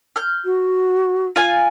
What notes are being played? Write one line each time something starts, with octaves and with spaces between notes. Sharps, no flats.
F6 G6
F#4
F4 G#5